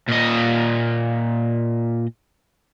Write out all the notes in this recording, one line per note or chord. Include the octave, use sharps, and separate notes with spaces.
A#2 D#5